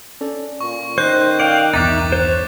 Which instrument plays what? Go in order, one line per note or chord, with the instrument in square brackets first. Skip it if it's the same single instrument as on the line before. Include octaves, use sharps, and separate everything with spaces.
[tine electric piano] C#4 A4 D5
[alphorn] A#2 [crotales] C#6
[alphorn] D#3 [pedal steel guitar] C5 D#5 [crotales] F#6 G6
[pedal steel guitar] D5 F5 G5 [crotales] G6
[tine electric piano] B1 E2 G2 [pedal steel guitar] D#4 E5 F#6 [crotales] D6 A6
[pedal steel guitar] C5 C#5